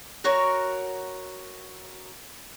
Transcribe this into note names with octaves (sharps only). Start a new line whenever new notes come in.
F#4 A#4 C#5